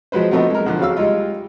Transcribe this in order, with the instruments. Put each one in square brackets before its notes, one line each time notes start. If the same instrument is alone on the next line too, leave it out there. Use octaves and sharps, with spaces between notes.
[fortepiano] F3 F#3 G#3 B4 C5
F3 F#3 A3 B3 D#4
G#3 A#4
D3 F3 F#6
C#3 F#3 F5 E6
G3 G#3 D#4 F4